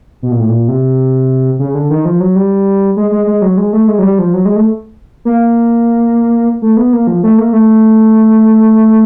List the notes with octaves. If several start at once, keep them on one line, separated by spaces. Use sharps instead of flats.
B2
A#2
A2
A#2
C3
C#3
D3
D#3
F3
F#3
G3
G#3
G#3
G#3
F#3
G#3
A3
G#3
F#3
G3
F3
F#3
G#3
A3
A#3
A3
B3
A#3
F3
A3
A#3
A3